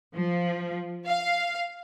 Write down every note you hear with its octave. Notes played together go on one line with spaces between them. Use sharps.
F3
F5